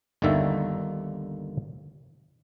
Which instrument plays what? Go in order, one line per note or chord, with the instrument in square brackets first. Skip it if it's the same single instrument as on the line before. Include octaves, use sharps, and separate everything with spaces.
[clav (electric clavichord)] G1 D#2 D3 D#3 A#3 E5